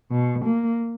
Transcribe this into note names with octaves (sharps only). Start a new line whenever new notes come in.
B2
A#3